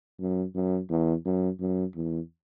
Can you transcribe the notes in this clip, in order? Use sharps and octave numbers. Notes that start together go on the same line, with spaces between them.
F#2
F#2
E2
F#2
F#2
E2